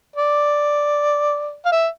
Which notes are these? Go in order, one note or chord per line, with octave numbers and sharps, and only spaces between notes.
D5
F5
E5